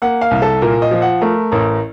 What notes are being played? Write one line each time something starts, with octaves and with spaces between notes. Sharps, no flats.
A#3 F#5
F5
C2
A4
A#2 A#4
D#5
F3
F#5
A3 A#4
A1 A#4